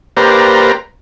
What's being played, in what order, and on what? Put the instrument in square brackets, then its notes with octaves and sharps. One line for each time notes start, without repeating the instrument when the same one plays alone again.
[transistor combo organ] A#3 G4 B4 C5 D5 A#5